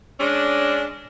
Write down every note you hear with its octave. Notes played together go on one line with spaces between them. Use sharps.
G#3 C#4 D4